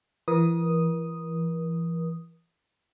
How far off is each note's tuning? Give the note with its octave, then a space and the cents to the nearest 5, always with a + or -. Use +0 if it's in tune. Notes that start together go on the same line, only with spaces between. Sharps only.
E3 +30 A#4 +40 D#6 +0